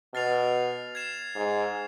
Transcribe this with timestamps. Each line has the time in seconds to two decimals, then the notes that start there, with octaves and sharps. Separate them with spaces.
0.14 B2 F6 A6 C7 F7
0.95 G#6 C7 E7
1.36 G#2